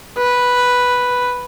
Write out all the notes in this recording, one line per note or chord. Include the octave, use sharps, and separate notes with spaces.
B4